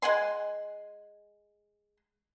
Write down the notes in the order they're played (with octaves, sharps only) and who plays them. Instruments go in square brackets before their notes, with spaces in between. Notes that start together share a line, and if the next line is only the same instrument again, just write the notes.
[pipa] G#3 F#5 G#5 C6